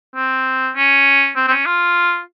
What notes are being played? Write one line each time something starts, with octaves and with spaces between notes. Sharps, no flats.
C4
C#4
C4
C4
C#4
F4